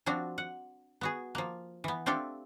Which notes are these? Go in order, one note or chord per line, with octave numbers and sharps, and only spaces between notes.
F3 C4 D4 F#4
F#5
B3 F#4 G#4
F3 A#3
E3 B3
A3 C4 D4 F4 G4 A4